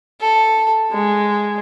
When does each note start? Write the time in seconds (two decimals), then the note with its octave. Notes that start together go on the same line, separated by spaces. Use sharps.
0.21 A4
0.92 G#3